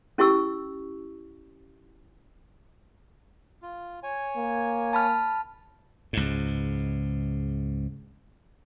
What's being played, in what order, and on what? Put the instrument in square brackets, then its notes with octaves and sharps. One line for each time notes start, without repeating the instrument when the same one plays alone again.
[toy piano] C#4 E4 G4 C#6 E6
[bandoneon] F4
C#5 G#5
[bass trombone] A#3
[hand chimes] A5 B5 F6
[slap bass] C#2 G#2